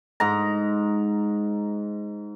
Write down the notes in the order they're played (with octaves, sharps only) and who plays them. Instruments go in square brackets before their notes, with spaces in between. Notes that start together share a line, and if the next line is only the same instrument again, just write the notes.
[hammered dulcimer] G#2 A#5